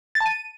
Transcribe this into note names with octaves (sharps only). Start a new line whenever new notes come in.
A6
A5
D#7